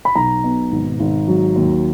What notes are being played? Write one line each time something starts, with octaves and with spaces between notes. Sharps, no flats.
B5
B1 A#5
B2
G#1
G#1
F#3
D#2